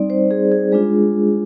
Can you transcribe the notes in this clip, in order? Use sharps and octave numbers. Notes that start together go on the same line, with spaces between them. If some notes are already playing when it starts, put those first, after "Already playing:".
Already playing: G3 C4 D#4 D5
C5
G#4
G#4
G#3 D4 F4 G#4